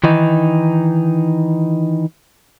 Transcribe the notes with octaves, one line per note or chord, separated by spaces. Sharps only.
D#3 E3 D#4